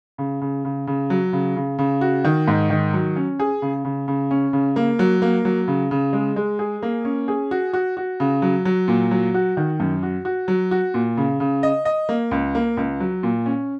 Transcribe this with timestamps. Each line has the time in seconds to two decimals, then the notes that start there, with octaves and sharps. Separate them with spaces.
0.18 C#3
0.41 C#3
0.65 C#3
0.87 C#3
1.10 F#3
1.33 C#3
1.56 C#3
1.78 C#3
2.01 F#4
2.24 D#3
2.48 G#2
2.70 D#3
2.93 F#3
3.16 C#4
3.39 G#4
3.62 C#3
3.85 C#3
4.08 C#3
4.31 C#4
4.53 C#3
4.76 A#3
4.99 F#3
5.22 A#3
5.45 F#3
5.68 C#3
5.91 C#3
6.13 G#3
6.36 G#3
6.59 G#4
6.82 A#3
7.05 C#4
7.28 G#4
7.51 F#4
7.73 F#4
7.97 F#4
8.20 C#3
8.42 F#3
8.65 F#3
8.88 A#2
9.11 F#3
9.34 F#4
9.57 D#3
9.80 F#2
10.03 F#4
10.25 F#4
10.48 F#3
10.71 F#4
10.94 A#2
11.17 C#3
11.40 C#3
11.63 D#5
11.85 D#5
12.09 A#3
12.31 C#2
12.55 A#3
12.77 C#2
13.00 F#3
13.23 A#2
13.46 C#4